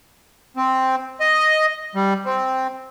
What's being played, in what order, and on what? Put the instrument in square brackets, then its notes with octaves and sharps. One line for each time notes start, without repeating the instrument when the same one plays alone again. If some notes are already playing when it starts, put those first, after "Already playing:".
[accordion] C4
D#5
G3
C4